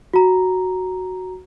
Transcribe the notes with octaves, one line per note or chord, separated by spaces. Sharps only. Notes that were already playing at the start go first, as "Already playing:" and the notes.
F#4 A#5